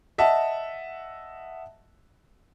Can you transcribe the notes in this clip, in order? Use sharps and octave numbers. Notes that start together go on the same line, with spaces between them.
D#5 E5 F#5 A5